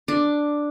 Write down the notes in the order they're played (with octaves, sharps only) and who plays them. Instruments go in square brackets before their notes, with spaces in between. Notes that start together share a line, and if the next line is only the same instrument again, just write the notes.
[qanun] D4